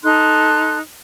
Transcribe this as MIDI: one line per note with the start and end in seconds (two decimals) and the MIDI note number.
0.03 0.77 63
0.03 0.77 69
0.03 0.77 84
0.03 0.77 90